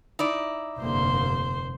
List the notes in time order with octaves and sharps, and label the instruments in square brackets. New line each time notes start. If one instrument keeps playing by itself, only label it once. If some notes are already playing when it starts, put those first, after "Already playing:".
[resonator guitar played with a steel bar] D#4 E4 D5
[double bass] F1 [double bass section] G2 D3 A#3 [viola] C5 C6